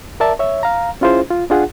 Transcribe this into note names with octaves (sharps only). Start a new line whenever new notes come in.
A#4 D5 E5 A5
C#5 E5
F5 A#5
C#4 E4 F4 G#4 C5
F4
D4 F4 G#4 F#5